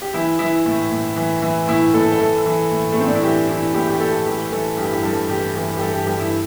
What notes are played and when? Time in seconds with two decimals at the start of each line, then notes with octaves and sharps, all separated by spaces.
0.02 G4
0.14 E3 E4
0.39 E3 E4
0.66 A2
0.91 A2
1.16 E3
1.42 E3
1.68 A2 E4
1.94 A2 A4
2.12 A4
2.20 E3
2.46 E3
2.71 A2
2.92 A3
2.97 A2 C4
3.07 D4
3.15 E4
3.23 E3 G4
3.49 E3 E4
3.74 A2 G4
3.90 G4
4.00 A2 A4
4.26 E3 G4
4.52 E3 A4
4.77 G2 G4
4.85 E4
4.93 G4
5.03 G2 A4
5.29 E3 G4
5.55 E3 G4
5.77 G4
5.81 G2 A4
5.93 G4
6.07 G2 G4
6.20 E4